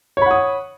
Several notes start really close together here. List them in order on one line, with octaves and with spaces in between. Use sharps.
C#5 B5 F#5 D#6